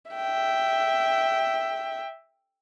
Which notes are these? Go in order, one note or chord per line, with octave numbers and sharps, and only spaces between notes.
E5 G5